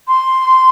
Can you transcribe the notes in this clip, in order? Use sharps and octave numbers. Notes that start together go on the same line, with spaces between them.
C6